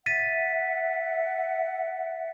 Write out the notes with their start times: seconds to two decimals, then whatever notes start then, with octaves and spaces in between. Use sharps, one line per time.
0.06 E5 F#5 A6 B6 D#7